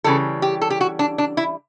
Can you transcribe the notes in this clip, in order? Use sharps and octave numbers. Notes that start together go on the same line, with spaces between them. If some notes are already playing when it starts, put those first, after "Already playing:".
C#3 E3 G3 A4
G4
A4
G4
F#4
D4
D4
E4